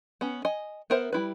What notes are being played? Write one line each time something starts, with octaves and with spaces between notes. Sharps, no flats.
B3 C#4
D#5 G#5
B3 A#4 C5 E5
G3 E4 B4